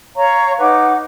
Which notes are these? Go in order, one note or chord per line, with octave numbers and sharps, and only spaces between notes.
C#5 F5 A#5 C#6
D#4 B4 F#5 D6